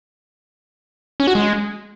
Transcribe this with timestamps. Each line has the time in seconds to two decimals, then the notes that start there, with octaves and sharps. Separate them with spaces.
1.20 C#4
1.27 F#4
1.35 G#3